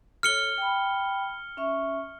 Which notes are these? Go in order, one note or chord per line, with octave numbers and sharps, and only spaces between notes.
A4 C#5 F6 C#7 G7
G5 B5
C#4 E5 C#6